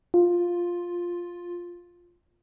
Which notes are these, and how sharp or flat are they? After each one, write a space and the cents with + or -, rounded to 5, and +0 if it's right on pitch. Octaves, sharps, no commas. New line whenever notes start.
F4 +5